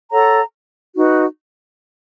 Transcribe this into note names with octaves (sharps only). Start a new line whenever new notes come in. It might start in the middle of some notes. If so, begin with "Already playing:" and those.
A4 C#5 F#5 A#5
D#4 F#4 B4